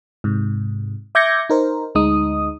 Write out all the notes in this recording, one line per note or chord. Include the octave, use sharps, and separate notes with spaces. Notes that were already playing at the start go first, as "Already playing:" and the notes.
G#2 C3
E5 D6 G6 G#6 A#6 C#7
D#4 A#4 C5
D2 G#3 D#4 D#6